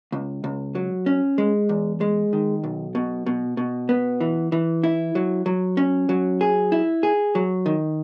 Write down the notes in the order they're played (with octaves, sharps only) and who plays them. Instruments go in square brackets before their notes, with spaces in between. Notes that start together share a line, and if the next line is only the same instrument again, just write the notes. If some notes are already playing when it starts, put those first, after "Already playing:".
[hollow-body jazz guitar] C#2
C#2
F#3
C#4
G#3
E2
G#3
D#3
B1
B2
B2
B2
B3
E3
E3
E4
F#3
F#3
C#4
F#3
G#4
E4
G#4
F#3
D#3